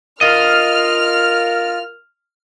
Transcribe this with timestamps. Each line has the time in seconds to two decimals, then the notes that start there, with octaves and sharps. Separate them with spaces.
0.21 F4 A#4 D#5 F6